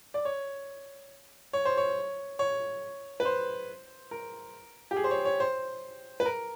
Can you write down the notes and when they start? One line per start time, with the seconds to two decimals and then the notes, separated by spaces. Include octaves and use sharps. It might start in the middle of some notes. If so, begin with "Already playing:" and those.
0.14 D5
0.25 C#5
1.53 C#5
1.65 C5
1.77 C#5
2.39 C#5
3.20 B4
3.25 C5
4.11 A#4
4.91 G4
4.96 G#4
5.04 C5
5.11 C#5
5.25 C#5
5.40 C5
6.20 B4
6.25 A#4